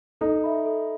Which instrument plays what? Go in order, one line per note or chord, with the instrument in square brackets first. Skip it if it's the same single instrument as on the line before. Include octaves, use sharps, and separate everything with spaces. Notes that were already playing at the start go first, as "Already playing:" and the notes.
[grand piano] D#4 [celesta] A4
[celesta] E5 B5
A4